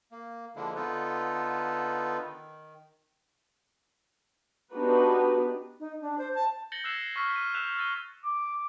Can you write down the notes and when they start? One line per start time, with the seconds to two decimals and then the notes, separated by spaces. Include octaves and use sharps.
0.12 A#3
0.56 D3 F3 G#3 A#3 D4 E4
0.75 D3 B3 D#4 F4 A4 B4
2.21 D#3
4.73 B3 D4 D#4 F#4 G4 B4
5.80 D#4
6.01 D4
6.18 C5
6.35 A5
6.72 G6 A6 A#6 C#7 F#7 G7
6.84 E6 F#6 G#6 A6 C7 E7
7.16 C#6 E6 F6 B6
7.36 F6 D#7
7.54 E6 F#6 G6 B6 E7 F7
7.77 E6 F#6 A6 D#7 G7
8.24 D6